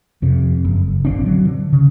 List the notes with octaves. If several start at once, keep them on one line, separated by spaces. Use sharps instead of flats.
F2 C3
F#1
A1 D3 C4 D4
F#3
D3
C#3